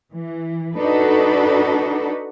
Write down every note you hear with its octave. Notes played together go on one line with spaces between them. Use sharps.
E3
D4 D#4 F#4 A4 B4